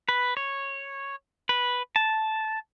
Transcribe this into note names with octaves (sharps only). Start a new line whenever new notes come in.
B4
C#5
B4
A5